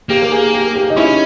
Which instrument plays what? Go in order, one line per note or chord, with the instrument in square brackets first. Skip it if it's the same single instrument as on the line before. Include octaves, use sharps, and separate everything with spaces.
[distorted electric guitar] A#3 [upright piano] G4
[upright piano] A#4
G#4
G4
G4
D#4
[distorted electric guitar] C#4 [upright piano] E4